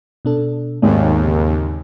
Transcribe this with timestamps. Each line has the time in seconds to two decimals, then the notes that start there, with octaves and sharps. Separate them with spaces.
0.25 B2 D4 A4
0.82 G#1 D#2 B3
1.25 C#3